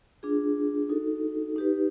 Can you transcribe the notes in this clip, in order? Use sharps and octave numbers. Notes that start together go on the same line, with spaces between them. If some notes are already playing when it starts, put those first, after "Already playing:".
D4 F4 G#4
D#4 F#4 A4
D#4 G4 B4